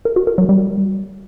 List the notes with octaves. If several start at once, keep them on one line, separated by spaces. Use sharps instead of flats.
A#4
F#4
A#4
F#3
G3